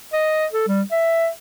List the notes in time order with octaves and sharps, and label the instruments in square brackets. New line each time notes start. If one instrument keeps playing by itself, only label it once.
[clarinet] D#5
A4
G3
E5